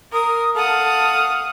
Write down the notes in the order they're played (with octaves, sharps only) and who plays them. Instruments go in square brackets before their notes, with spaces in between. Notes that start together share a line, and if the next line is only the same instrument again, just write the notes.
[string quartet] A#4 [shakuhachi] D#6
[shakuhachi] A4 [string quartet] F5 F#5 D#6